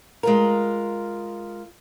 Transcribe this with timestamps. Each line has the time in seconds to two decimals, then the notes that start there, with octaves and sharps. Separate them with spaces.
0.23 G#3 F4 A#4